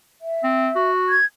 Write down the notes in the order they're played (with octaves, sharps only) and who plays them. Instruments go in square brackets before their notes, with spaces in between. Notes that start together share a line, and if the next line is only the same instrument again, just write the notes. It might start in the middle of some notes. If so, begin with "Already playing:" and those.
[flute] E5
[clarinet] C4
F#4
[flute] G#6